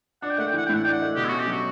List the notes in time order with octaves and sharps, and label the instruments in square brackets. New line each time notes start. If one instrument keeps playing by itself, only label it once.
[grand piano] D4 [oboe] F#5
[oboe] G5
[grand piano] A3 [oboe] F#5
[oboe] G5
[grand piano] E3 [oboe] F#5
[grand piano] A2 [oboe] G5
[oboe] F#5
[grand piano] D4 [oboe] G5
[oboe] F#5
[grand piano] A3
[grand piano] B2 [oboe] G4
[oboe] E4
F#4
[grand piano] C#4
[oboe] G4
[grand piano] F#3 [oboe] F#4